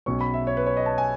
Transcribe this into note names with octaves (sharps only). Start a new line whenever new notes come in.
B1 B2 F#3 C#4 C#6
B5
E5
C#5
B4
C#5
D#5
A5
G#5